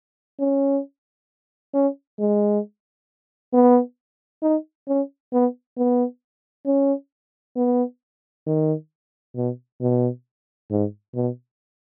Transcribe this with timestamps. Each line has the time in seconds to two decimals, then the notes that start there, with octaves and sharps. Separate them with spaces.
0.39 C#4
1.74 C#4
2.19 G#3
3.53 B3
4.42 D#4
4.88 C#4
5.33 B3
5.77 B3
6.66 C#4
7.56 B3
8.46 D#3
9.36 B2
9.81 B2
10.71 G#2
11.15 B2